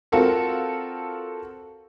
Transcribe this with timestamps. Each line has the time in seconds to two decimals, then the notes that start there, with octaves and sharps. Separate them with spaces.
0.12 C4 F4 F#4 A4 A#4